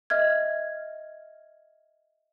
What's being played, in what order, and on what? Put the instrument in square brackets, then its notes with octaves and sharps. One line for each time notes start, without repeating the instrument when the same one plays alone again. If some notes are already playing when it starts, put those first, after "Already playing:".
[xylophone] D#5 E5 F6 G#6